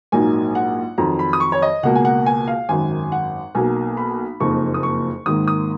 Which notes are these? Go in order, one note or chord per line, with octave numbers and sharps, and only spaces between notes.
A#1 G#2 F#3 A#3 D#4 G#5
F#5
F2 D#3 F#3 A#5
B5
D#6
C#6
C#5
D#5
C#2 B2 A#3 F#5
G#5
F#5
G#5
F5
G#1 F#2 D#3 G#5
F#5
B1 B2 A#3 G#5
B5
F#1 F2 F3 A#3 D#4 C#6
D#6
C#6
G#1 G#2 D#3 A#3 D#6
D#6